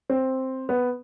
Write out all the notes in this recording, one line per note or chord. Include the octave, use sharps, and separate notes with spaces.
C4
B3